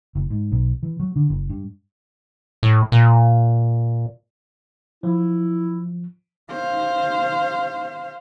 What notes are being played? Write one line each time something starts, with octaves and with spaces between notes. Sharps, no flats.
F#1
G#2
B1
E3
F#3
D3
F#1
G2
A2
A#2
F3 E4
C5 F5